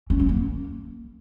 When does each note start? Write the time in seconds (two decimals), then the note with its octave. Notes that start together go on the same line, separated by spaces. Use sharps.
0.10 C#4
0.19 F#3
0.29 A#3